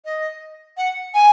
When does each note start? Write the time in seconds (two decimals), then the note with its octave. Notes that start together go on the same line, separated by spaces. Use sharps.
0.05 D#5
0.77 F#5
1.14 G#5